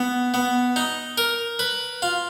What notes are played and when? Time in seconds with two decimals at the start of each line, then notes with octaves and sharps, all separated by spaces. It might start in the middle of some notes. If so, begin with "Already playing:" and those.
Already playing: B3
0.34 B3
0.76 D#4
1.18 A#4
1.59 B4
2.02 F4